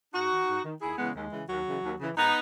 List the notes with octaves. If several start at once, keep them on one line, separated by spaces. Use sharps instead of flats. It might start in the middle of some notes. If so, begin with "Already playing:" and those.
G#2 D#4 F#4
D#3
G#2
D#3
D#2 E4 G#4
C#3 E3 G#3 B3
D#2 G#3
C#3 E3
D#2 F#3
C#3 E3
D#2
C#3 E3
G#2 B3 D#4